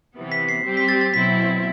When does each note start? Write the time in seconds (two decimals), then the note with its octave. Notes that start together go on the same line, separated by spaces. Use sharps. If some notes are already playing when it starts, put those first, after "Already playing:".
0.15 C3 E3 B3
0.32 B6
0.49 C7
0.65 G3 C4 G4
0.77 B6
0.88 A6
1.01 A6
1.13 B2 F#3 C4 E4 B6